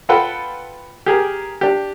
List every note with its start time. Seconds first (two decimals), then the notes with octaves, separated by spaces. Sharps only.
0.09 F4 A4 B4 F#5 G5
1.06 G4 G#4 A#4
1.61 D4 G4